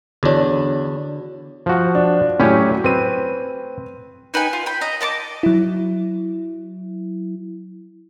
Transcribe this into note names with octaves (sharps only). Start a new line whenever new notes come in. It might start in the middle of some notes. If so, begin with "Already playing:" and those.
E2 D3 D4 F#4 C#5
F3 F#4
D4
A2 F#3 C#4 G4 G#5
C4 B4 D#7
D#4 B4 G5 G#5
F4
G5 B5
D#5 A#5
D#5 A5 C#6 D6
F#3 E4